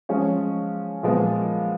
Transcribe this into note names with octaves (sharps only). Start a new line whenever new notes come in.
F3 G#3 C#4 C#5
A#2 F3 G#3 B3